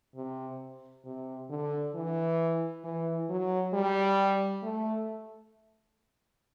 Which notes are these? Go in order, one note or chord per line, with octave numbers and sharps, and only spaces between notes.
C3
C3
D3
E3
E3
F#3
G3
A3